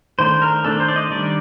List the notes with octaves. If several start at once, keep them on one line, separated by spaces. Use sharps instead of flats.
D#3 A3 D4 C5
A#4
D#3 A3 D4 A4
C5
D5
D#5
D#3 G3 D4 D5